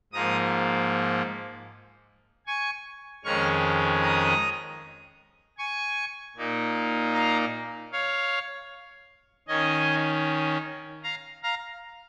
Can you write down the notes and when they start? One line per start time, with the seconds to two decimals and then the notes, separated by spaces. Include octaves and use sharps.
0.13 G#2 F3 A#3 A#5 D#6
2.47 G#5 C#6
3.24 F2 D#3 G#3 C#4 C#6 F6
4.02 A#5 D#6
5.58 G#5 C#6
6.36 A#2 A#3 D#4
7.14 F5 A#5
7.92 C#5 F5
9.48 D#3 C#4 D#5 G#5
11.03 F5 A#5
11.43 F5 A#5